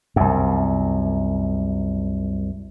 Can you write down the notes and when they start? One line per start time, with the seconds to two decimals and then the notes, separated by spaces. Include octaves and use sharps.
0.16 C2 F#2